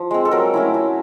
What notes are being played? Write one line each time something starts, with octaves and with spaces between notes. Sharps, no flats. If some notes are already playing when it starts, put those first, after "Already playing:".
Already playing: F3
G#3 C4
A4
F#3 A#4
A3 C#4 E4
F#3